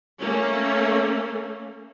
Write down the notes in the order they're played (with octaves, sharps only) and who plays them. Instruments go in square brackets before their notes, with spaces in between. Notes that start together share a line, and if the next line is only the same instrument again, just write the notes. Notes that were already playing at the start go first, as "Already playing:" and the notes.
[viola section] A3 A#3 C#4